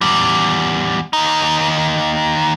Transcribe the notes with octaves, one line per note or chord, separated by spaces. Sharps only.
E2 G3
D#2 D#4